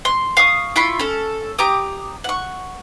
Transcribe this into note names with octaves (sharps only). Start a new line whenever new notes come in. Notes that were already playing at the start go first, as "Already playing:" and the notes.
C6
F5 C#6 D#6
E4 F4 B5 C#6
C#4 A4
G4 A#5 D6 D#6
F#5 C#6